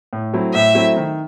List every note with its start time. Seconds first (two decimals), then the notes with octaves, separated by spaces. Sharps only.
0.13 A2
0.33 F#3 A3 C4 E4
0.54 A2 E5
0.75 F#3 A3 C4 E4
0.97 D#3